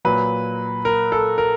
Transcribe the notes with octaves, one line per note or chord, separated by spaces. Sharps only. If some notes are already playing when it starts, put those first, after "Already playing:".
A#2 F#3 B4
A#4
A4
A#4